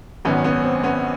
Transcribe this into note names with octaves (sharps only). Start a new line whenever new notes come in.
G#1 F#2 D#3 B3 C#4
B3 C#4
C4
B3 C#4